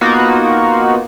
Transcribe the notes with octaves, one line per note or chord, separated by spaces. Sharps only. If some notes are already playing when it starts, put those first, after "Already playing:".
A#3 B3 D#4 F4 F#4